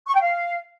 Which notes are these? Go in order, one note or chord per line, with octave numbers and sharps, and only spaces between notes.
C#6
G5
F5